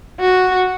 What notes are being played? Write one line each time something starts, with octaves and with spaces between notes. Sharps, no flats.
F#4